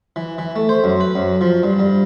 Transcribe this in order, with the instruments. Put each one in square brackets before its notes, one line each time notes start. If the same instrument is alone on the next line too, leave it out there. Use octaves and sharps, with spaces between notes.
[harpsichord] E3
E3
A3
C5
F#2
B4
F#2
F3
G2
G2